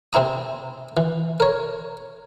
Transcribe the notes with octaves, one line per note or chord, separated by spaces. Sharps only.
C3 C4 E4 A#5 D#6
E3
A#4 C#5